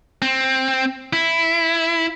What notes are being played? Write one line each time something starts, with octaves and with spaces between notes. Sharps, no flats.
C4
E4